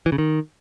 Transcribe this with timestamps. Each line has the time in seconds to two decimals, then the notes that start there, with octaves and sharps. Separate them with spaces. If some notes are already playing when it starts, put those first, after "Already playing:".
0.06 E3
0.12 C#3
0.18 D#3